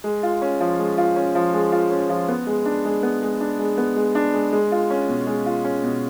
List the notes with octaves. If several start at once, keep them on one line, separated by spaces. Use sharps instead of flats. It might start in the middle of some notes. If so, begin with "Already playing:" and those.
G#3
F4
C#4
F3
G#3
F4
C#4
F3
G#3
F4
C#4
F3
B3
G#3
D4
G#3
B3
G#3
D4
G#3
B3
G#3
D4
G#3
G#3
F4
C#4
B2
G#3
F4
C#4
B2